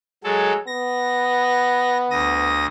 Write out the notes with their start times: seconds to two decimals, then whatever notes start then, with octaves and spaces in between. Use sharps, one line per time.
0.24 F#3 G#3 A4
0.67 B3 A#6
2.11 D2 D#6 A#6